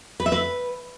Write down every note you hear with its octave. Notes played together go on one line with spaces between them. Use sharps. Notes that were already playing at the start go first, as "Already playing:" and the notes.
B4
E5
B4